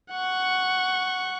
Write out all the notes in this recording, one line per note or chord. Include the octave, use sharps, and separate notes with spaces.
F#5 C#6